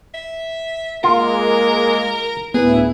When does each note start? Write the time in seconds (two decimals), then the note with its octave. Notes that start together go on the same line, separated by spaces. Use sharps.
0.14 E5
1.04 G#3 A#3 F4 A#4
2.54 D2 A2 B3 E4 G#4